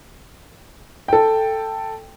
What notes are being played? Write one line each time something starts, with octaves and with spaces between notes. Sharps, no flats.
A4 G5